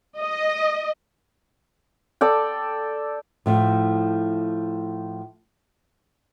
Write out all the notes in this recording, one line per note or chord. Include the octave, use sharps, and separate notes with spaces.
D#5
A4 D5 G5
A2 F3 A3